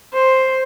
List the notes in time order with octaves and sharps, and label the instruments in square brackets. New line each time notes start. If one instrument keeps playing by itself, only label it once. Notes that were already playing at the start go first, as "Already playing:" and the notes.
[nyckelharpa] C5